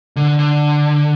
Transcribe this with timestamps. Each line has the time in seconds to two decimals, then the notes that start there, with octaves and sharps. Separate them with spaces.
0.16 D3
0.39 D3